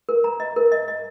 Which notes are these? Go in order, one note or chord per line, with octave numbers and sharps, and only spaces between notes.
A#4
A#5
D#5
A#4
D#5
D#5